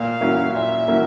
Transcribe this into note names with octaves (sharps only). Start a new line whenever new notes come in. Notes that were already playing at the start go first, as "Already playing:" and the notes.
Already playing: A#2 F5
F#3 A#3 C#4 E4
A#2 E5
F#3 A#3 C#4 E4